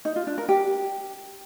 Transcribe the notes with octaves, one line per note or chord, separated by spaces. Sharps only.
D#4
F4
D4
A#4
G4